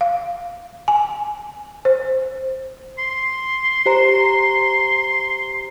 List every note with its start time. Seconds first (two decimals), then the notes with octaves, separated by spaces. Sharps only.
0.01 F5
0.88 G#5
1.85 C5
2.98 C6
3.86 G4 C5 A#5